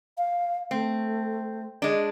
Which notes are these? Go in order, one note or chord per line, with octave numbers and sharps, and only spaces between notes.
F5
A3 C4
G#3 D4